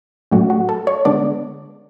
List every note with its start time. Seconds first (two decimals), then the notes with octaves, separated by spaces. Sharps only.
0.31 A2 F#3 A3 C#4 F#4
0.50 F#4
0.69 A4
0.87 C#5
1.05 D3 G#3 B3 D4 D5